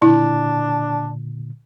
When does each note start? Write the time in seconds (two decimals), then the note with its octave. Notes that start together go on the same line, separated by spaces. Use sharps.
0.02 A#2 D3 D4 E4